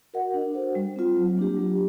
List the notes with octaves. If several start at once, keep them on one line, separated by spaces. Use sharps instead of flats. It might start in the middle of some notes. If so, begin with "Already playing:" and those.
F#4 A#4 D#5 F#5
D4
F#4 A4 C5
G3
C4 F4
F#3
A#3 D4 G4
F#3